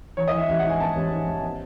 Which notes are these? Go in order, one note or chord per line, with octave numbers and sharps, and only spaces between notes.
E3 C#5
D#5
E3
E5
A1 E5
F#5
G#2
G#5
B3 A5
A1
G#2
A1
B3